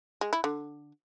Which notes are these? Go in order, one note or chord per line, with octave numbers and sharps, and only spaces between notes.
G#3
E4
D3